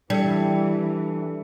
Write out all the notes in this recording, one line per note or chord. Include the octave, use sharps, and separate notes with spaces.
E3 G3 D4 A4 C#7